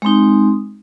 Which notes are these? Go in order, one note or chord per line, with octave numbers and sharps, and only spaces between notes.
G#3 C4 D#4